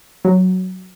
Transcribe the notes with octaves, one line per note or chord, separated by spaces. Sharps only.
F#3